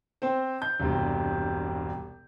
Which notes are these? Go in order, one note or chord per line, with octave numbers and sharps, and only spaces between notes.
C4 C5
G6
E1 C2 G2 C3